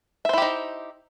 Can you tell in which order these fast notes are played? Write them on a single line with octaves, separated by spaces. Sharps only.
E5 C5 E4 G4 D#4